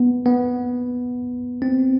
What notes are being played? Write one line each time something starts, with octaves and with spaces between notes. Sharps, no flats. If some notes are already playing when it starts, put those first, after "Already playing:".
Already playing: B3
B3
C4